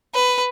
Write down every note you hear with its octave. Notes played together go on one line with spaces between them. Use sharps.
B4